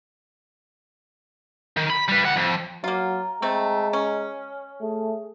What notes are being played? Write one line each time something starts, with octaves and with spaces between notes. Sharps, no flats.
D#3
B5
G3 B4
D2 F#5
F2
F#3 A#3 F4 A#5
G#3 A3 C4
C#4
A3 G#4